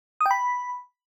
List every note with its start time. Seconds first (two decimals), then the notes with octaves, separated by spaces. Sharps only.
0.21 D#6
0.26 G5
0.31 B5